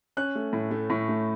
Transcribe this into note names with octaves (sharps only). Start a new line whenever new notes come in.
C#4 F#6
A3
A2
A3
A2 C#6
A3